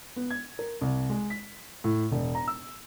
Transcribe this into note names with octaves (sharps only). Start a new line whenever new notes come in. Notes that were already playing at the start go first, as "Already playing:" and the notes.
B3
G#6
A#4
C2
G#3
B6
A2
E1
A#5
E6